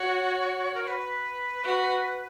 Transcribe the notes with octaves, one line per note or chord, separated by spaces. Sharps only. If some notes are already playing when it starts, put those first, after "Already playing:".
Already playing: F#4 C#5
A#4
C#5
B4
F#4